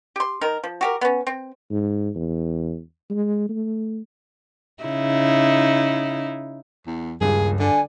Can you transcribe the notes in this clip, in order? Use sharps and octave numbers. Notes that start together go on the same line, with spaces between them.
G4 C6
D#3 A#4
F3
F#4 G4 A#4
B3 C#4
C4
G#2
E2
G#3
A3
C#3 D#4 E4
E2
D#1 C#2 G2 G#4
D3 D5 G#5